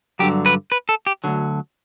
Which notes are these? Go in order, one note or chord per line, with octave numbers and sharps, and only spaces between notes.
G2 D3 F#3 G4
B4
B4
A4
G4
D2 D3 F#3